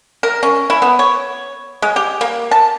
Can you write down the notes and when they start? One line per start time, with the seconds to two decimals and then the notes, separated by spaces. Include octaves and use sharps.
0.23 A#4
0.43 C#4
0.70 E4
0.82 B3
0.99 C#5
1.82 G#3
1.96 G4
2.21 A#3
2.51 A5